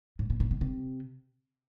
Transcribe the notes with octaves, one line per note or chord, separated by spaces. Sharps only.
A2
A#2
A#2
B2
C3